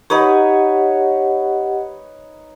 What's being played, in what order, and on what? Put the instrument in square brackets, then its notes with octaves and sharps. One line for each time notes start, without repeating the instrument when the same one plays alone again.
[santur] D#4 B4 C#5 [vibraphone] G4 D#5 F#5